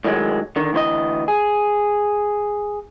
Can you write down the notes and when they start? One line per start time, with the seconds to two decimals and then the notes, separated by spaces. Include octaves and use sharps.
0.05 A2 D#3 F#3 G#3
0.56 D3 D#3
0.73 D2 E3 C5 D#5
1.28 G#4